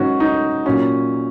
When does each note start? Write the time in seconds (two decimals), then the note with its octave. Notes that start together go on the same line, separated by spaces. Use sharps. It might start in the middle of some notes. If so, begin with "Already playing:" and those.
Already playing: G#2 D#3 F#3 C#4 F#4
0.20 D#4
0.65 A#2 F#3 C#4